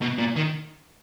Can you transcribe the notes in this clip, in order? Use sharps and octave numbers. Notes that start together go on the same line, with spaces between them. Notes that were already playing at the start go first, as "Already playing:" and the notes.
B2
A#2
D#3